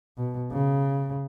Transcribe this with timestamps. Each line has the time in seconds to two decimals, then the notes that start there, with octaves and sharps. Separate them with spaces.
0.18 B2
0.51 C#3